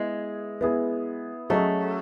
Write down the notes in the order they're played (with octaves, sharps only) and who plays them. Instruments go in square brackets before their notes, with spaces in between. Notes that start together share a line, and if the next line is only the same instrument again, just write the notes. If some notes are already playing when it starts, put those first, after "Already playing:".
Already playing: [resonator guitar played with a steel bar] G#3 [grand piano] B3 E4 G#4
[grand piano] B3 E4 G#4
[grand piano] F#3 C#4 G#4 D#5 [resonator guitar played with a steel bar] A3